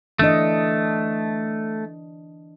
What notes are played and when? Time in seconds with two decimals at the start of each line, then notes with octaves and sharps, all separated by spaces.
0.19 E3 A3 D4 D#5